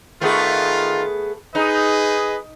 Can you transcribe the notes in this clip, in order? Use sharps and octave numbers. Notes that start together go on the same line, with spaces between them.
D#3 A3 B3 F4 G#4
D#4 G#4 B4 D#5